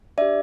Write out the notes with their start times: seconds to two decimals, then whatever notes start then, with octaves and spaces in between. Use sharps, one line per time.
0.18 D4 G4 D5 E5